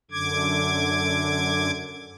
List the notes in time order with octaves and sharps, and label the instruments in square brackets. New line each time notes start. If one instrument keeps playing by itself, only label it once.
[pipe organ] F#2 D3 D6 G#6